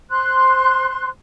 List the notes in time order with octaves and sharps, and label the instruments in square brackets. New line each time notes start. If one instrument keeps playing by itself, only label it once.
[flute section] C5 C6 F#6